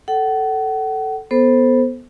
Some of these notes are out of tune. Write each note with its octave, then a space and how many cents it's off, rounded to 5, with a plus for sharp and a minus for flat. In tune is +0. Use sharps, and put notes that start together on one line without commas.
A4 +0 F#5 +35
B3 -5 A4 +0 C5 +0